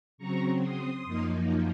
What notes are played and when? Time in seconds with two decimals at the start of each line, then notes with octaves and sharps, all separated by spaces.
0.18 C#3 F#3 C4 A#5 C#6
0.61 C6 D#6
1.05 F#2 F3 A#3 D#4